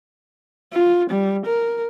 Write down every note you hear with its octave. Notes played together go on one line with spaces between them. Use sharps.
F4
G3
A#4